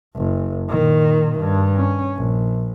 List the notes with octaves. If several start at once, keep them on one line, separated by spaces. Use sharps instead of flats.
F#1
A#2 D#3
G2
C#4
A#1